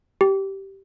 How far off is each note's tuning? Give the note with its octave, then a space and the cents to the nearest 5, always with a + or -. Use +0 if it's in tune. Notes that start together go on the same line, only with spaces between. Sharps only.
G4 -15